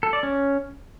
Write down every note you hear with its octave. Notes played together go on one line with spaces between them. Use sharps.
A4
D5
C#4